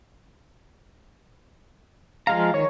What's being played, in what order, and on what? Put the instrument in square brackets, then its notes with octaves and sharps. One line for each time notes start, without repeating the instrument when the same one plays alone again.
[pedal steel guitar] F3 G#3 A#5 [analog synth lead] F5
[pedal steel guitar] D#3 [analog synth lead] C#5